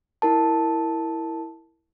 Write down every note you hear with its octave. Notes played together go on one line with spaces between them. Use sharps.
E4 A#4 A5